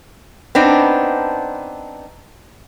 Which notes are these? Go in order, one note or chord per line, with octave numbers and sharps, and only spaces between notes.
B3 C4 D4 D#4